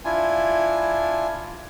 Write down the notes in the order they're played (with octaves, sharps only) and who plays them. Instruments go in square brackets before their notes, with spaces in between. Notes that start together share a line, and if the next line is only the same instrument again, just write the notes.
[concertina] D4 E4 F4 G#5